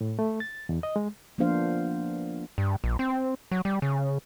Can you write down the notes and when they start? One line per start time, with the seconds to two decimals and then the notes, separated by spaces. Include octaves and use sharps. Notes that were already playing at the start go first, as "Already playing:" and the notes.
0.01 A2
0.19 A3
0.40 A6
0.69 E2
0.83 D#5
0.96 G#3
1.38 F3 A#3 B3 D4 C5 F5
2.58 G2
2.84 A#1
2.99 C4
3.51 F#3
3.65 G3
3.82 C#3